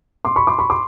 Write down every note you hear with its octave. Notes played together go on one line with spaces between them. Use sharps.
C6 D6
B5 C#6
C6 D6
B5 C#6
C6 D6